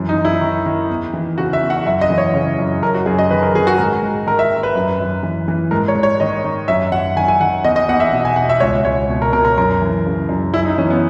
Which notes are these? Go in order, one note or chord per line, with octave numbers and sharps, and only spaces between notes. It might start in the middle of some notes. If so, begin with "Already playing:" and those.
Already playing: F#2 E3
D#4
F#2
E4
D#3
D#3
E2
E3
C#3 F#4
E5
E2
F#5
F#2 E5
D#5
E3
C#5
C#3
F#2
F#2 A#4
F#4
F#2 G#4
D#5
D#3 B4
A#4
D#3 G#4
F#4
G#2 A#4
G#2
D#3 A#4
E5
D#3
B4
F#2
F#2
E3
E3
G#2 A#4
C#5
G#2
C#5
D#3 D#5
D#3
F#2 E5
F#2 F#5
D#3 G#5
G#5
D#3 F#5
E2 D#5
D#5
E2 F#5
E5
B2
G#5
B2 F#5
E5
C#2 C#5
C#2 C#5
B2
A#4
B2 A#4
A#4
F#2 A#4
E3
C#3
F#2
F#2 E4
D#4
E3 C#4
B3